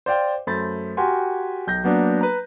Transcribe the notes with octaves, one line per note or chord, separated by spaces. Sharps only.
C5 D5 F5 G5
F#2 A3 C5 B5 A6
F#4 G4 A#4 G#5 C6
B1 G6 A#6
F#3 A#3 B3 D4
B4 A#5